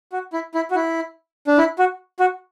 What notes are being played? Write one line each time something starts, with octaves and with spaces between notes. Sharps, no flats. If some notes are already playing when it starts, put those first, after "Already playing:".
F#4
E4
E4
F#4
E4
D4
E4
F#4
F#4